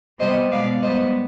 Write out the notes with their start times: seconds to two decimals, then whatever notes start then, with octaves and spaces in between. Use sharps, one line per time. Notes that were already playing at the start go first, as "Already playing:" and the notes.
0.20 C3 G3 B3 C5 D#5
0.51 B2 G#3 B3 D5 F5
0.82 G#2 G3 B3 C5 D#5